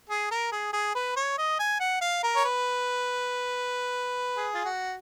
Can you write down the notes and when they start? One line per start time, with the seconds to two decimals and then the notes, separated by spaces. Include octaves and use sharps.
0.10 G#4
0.31 A#4
0.52 G#4
0.73 G#4
0.95 B4
1.16 C#5
1.38 D#5
1.59 G#5
1.80 F#5
2.01 F5
2.24 A#4
2.36 C#5
2.45 B4
4.37 G#4
4.55 F4
4.65 F#4